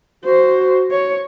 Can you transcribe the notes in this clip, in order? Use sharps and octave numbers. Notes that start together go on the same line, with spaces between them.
F#4 C5
C#5